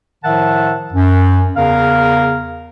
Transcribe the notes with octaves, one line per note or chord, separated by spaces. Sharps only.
A2 D#3 F3 E5 F#5 A5
F#2
E2 C#3 A#4 F5